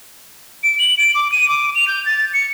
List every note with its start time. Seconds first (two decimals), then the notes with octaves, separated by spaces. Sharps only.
0.63 D7
0.79 F#7
0.97 D7
1.15 D6
1.32 D#7
1.48 D6
1.75 F7
1.88 G6
2.06 A6
2.34 C#7